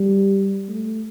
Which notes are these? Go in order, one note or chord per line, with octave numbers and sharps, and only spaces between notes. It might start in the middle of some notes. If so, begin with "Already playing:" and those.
Already playing: G3
A3